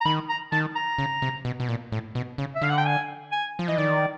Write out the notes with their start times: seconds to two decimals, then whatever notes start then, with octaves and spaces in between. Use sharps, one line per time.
0.01 A#5
0.05 D#3 B5
0.29 A#5
0.52 D#3 A5
0.75 A#5
0.98 C#3
1.22 C3
1.45 B2
1.60 B2
1.69 A#2
1.92 A2
2.15 B2
2.38 C#3
2.55 E5
2.62 D3 F5
2.70 F#5
2.78 G5
2.85 G#5
3.32 G#5
3.59 F3
3.68 E3 D#5
3.78 D#3 D5